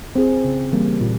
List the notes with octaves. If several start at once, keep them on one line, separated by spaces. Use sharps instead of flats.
C4 F4 G#4
C#3
E3 G3 A#3
A#2